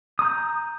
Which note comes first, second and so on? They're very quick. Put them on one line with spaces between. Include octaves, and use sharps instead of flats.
D#6 A#5 G6